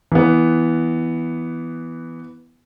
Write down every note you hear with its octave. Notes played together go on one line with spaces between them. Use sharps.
E3 B3